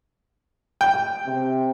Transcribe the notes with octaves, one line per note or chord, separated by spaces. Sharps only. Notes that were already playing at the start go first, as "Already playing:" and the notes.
G5
C3